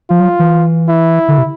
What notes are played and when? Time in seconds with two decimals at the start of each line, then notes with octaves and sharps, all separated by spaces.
0.10 F3 F4
0.20 F#3
0.39 E3
0.89 E4
1.28 D3
1.38 C3